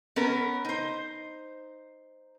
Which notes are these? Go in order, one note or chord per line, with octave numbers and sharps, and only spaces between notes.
B3 C#4 A#4 B4
D#4 C5